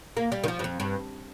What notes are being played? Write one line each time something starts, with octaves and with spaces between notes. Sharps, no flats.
A#3
G3
D#3
F3
G2
F2
G2